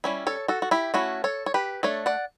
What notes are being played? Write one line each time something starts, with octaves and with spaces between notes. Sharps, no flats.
G3 C#4 E4
A4 C#5
F#4 A4
F#4
E4 G4
A3 C#4 E4 F#4
A4 C#5
C#5
G4 B4
A3 D4 A4 C#5
D5 F#5